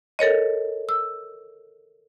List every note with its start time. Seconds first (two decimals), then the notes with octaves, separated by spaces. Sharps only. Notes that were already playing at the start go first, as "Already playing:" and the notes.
0.19 A4 A#4 C#5 D#5
0.89 E6